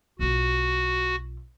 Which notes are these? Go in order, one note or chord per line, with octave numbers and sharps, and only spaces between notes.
B1 F4 F#4